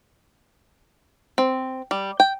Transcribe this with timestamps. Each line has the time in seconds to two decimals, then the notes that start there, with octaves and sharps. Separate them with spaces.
1.38 C4
1.91 G3
2.20 G5